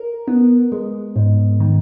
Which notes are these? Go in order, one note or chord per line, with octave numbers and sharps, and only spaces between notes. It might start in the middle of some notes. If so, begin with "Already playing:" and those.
Already playing: A#4
B3
G#3
G#2
D#3